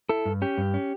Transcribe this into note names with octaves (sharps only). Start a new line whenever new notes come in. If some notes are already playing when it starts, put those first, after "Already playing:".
E4 A4
G2
C#4 G4
G2
C#4